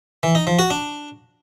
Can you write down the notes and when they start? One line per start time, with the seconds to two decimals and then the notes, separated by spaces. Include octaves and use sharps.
0.23 E3
0.35 D#4
0.47 F3
0.59 F#4
0.70 D4